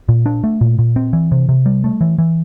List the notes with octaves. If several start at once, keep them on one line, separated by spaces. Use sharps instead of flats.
A#2
D4
A3
A#2
A#2
C4
E3
C3
C3
G3
A3
E3
E3